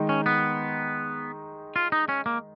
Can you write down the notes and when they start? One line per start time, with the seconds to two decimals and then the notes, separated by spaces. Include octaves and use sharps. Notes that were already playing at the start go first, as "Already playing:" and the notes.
Already playing: D#3 G#3 D#4
0.09 C#4
0.26 B3
1.76 F4
1.92 D#4
2.09 C#4
2.26 A#3